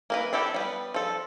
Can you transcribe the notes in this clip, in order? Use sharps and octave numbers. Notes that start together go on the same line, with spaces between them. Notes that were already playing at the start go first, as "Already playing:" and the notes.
A#3 A#4 B4
D4 E4 G4 A4
G3 B3
F3 A4